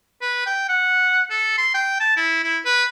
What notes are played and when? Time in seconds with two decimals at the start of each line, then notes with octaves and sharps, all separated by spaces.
0.21 B4
0.46 G5
0.69 F#5
1.30 A4
1.58 C6
1.74 G5
2.00 A5
2.17 E4
2.43 E4
2.66 B4